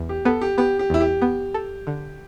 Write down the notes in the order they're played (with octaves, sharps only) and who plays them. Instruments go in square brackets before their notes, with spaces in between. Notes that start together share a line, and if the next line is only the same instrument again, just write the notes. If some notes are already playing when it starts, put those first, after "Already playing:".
Already playing: [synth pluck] E2
[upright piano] G4
[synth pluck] B3 [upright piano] A4
[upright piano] G4
[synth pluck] B3 [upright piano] G4
[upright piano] G4
[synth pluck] E2 [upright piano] E4
[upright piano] G4
[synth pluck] B3
A4
D3